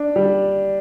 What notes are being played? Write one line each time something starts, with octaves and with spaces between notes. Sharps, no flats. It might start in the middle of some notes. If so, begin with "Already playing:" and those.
Already playing: D4
G3